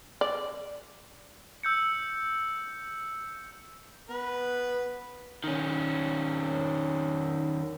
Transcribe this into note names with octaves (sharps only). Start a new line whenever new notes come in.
D5
E6 G6 C#7
B3 B4
D#3 C#4